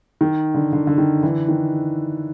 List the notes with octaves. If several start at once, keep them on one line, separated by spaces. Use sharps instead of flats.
D#3
D3
D3
D3
D#3
D3 E3
D#3